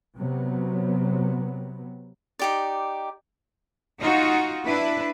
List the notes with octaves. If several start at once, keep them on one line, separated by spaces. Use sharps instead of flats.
C3 F#3 B3
D#4 G4 D5
D#4 F4 F#4
D4 E4 B4